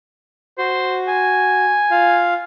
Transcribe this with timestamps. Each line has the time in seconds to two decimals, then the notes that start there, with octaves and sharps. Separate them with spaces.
0.58 F#4 C5
1.08 G#5
1.91 F4 F5